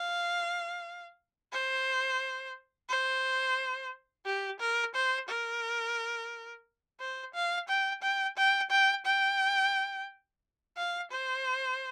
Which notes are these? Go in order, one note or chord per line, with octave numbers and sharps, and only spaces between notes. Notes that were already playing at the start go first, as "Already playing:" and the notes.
Already playing: F5
C5
C5
G4
A#4
C5
A#4
C5
F5
G5
G5
G5
G5
G5
F5
C5